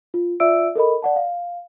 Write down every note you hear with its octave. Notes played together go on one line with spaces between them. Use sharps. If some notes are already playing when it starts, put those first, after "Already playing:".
F4
F4 D5 E5 E6 D7
A4 A#4 D#5 B5
D5 F#5 A5
F5